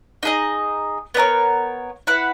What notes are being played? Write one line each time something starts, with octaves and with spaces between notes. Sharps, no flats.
D#4 G#4 D#5
B3 D#4 A#4 C#5
E4 B4 F#5